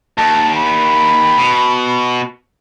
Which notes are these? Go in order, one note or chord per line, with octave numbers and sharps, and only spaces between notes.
D#2 A5
B5
B2